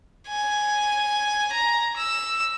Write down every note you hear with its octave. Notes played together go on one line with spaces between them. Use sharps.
G#5
A#5
E6